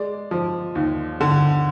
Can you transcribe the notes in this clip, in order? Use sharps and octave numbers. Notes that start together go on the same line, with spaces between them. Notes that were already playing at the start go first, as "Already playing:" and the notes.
Already playing: G#3 D5
F3
D#2
D3